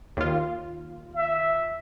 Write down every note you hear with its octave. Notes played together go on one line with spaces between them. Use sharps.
D#2 F4
E5